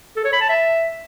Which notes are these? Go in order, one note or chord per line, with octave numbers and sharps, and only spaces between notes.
A4
C#5
B5
A5
E5